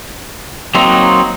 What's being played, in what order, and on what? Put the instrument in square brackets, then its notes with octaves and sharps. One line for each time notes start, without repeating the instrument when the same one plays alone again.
[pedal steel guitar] F#3 A#3 C4 D#4